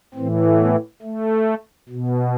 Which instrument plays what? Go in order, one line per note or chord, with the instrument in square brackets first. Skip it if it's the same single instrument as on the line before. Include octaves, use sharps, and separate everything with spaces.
[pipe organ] A2 E3 C4
B3
A3
B2